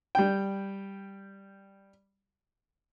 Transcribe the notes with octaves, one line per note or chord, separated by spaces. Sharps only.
G3 G5